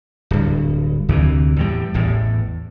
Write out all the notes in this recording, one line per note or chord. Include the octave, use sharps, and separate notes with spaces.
D1 G2
D2 C3 E3
E2 A2 G3
A1 E2 A2